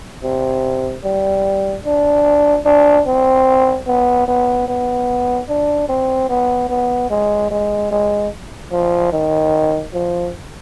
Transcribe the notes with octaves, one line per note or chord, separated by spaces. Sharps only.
C3
G3
D4
D4
C4
B3
B3
B3
D4
C4
B3
B3
G#3
G#3
G#3
F3
D#3
F3